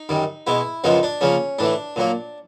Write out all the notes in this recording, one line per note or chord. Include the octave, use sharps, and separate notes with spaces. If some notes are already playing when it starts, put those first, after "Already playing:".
Already playing: D#4
F#2 D#3 G3
B2 G#3 B3 E4
F#2 C#3 F3 G#3 B3 D#4
D4
C#3 F3 A#3 C#4
A2 E3 A3 D4
A#2 F#3 A#3